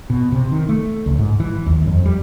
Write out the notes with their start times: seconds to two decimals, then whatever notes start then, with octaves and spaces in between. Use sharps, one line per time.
0.10 B2
0.32 C3
0.52 D#3
0.69 A3
1.06 C#2
1.18 G#2
1.40 E3
1.66 D#2
1.87 F2
2.05 G3